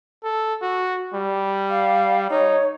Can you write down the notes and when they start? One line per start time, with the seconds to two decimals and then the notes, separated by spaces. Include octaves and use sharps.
0.24 A4
0.62 F#4
1.14 G3
1.70 F5
2.30 D#4 C#5